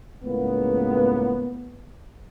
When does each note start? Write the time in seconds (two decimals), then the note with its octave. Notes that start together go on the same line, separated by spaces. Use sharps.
0.23 C#2 A2 C#3 A#3 B3